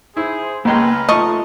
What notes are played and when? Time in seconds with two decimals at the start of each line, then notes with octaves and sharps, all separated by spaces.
0.17 E4 G#4 C5
0.65 C#2 G#3 A#3 C#4 B4 G5 A#5
1.09 A3 F4 D#5 A5 C#6